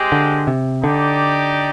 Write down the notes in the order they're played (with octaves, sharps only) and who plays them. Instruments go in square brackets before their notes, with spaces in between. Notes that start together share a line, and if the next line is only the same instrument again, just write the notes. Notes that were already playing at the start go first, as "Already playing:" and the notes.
Already playing: [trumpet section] G#3 C4 G4
[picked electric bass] D3
C3
[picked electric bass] D3 [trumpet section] D#4 G4 D5